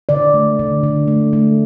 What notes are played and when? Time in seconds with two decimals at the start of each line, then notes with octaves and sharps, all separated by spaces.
0.09 D3 D5
0.34 A3
0.59 D3
0.83 D3
1.08 A3
1.33 A3